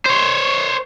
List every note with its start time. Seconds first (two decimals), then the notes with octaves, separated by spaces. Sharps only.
0.06 C5 C#5